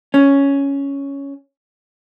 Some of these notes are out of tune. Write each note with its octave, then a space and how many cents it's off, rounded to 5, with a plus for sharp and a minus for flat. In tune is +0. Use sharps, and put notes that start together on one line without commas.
C#4 +5